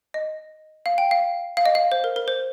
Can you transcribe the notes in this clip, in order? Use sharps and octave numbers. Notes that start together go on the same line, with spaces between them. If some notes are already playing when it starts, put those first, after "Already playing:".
D#5
F5
G5
F5
F5
D#5
F5
C5
A#4
A#4
C5